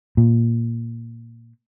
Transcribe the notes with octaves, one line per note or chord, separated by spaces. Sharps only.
A#2